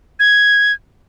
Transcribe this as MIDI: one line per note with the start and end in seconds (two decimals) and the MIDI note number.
0.20 0.72 92